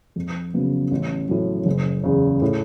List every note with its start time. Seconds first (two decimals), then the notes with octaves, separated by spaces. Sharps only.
0.16 F2
0.54 C#3 F#3 B3
0.92 A1
1.29 A2 F#3
1.66 F#1
2.04 E2 C#3
2.42 A2